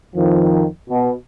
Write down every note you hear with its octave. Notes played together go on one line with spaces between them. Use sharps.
F2 D#3 F3
B2